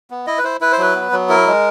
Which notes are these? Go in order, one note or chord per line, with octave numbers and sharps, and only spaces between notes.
B3
E4 D#5
B4
E4 C5
E4 B4
C5
F#3 B4
B3
F#3
E4 A#4
G#3